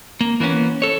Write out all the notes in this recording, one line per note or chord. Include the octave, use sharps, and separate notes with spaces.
A#3
E3 A#3 B3 C#4
A4 C#5